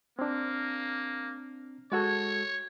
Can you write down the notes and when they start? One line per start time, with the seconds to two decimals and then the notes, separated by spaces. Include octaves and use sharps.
0.19 A#3 C4 D4
1.92 G#3 F#4 A4 C#5